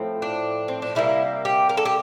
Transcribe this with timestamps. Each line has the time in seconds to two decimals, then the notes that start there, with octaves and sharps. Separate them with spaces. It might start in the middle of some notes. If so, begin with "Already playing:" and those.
Already playing: A2 F3 C4
0.22 D4
0.68 C4
0.82 D4
0.95 C3 G3 A#3 E4
1.45 G4
1.69 A#4
1.77 A4
1.85 G4